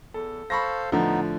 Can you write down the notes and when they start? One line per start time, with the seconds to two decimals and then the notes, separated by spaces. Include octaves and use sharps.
0.14 E2 A4
0.50 A4 C5 F5 B5 C#6 A#6
0.92 A2 D3 F3 B3 D#4